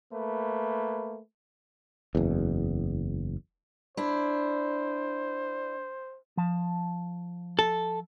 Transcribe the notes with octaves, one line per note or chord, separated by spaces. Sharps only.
A3 A#3 B4
F#1 E2
D4 E4 C5
F3 A5
A4